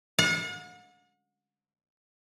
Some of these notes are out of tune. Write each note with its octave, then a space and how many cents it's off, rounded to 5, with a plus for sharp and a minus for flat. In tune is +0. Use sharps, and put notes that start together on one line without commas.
F#5 -45